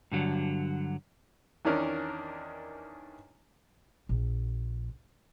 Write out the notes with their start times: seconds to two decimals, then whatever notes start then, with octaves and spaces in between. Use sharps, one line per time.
0.12 G2 D3 F#3
1.65 E2 D#3 C#4 D4 A#4
4.09 A#1